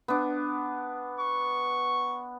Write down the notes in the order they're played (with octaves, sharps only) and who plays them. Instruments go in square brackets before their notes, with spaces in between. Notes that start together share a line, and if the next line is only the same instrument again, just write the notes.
[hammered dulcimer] B3 D4
[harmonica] C#6